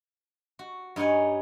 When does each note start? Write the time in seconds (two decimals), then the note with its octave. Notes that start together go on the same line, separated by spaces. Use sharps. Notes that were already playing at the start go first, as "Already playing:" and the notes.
0.59 F#4
0.96 G2 D#4 C#5 F#5 G#5